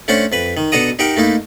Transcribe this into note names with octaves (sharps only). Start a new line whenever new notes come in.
A3 C#4 D4 C5 F#5
F2 B4 B5
D#3
B2 D4 A4 F#5 A#5 D#6
D#4 G4 A#4 F#5 G5
A3 A#3 D#4 E4